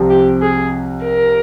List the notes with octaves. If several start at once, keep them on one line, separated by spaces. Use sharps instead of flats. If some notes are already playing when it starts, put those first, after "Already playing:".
Already playing: C2 C3 F3
G4
G#4
A#4